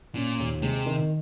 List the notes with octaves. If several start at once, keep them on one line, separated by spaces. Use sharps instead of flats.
A#2 C#4
D#2
C3 G#3
D#3